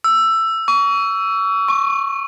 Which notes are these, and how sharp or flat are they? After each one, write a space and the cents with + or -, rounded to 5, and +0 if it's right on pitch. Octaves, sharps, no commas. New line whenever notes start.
E6 +10
C#6 +35
C#6 -20